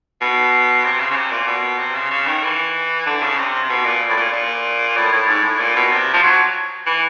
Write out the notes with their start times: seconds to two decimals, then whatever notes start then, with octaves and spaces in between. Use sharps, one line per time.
0.21 B2
0.84 C3
1.00 C#3
1.10 C#3
1.16 C3
1.31 A#2
1.47 B2
1.79 C3
1.95 C#3
2.11 C#3
2.27 D#3
2.43 E3
3.06 D3
3.22 C#3
3.37 C3
3.64 C3
3.69 B2
3.85 A#2
4.09 A2
4.17 A#2
4.32 A#2
4.96 A2
5.12 A2
5.29 G#2
5.43 A2
5.59 A#2
5.76 B2
5.91 C3
6.13 F3
6.23 F#3
6.86 E3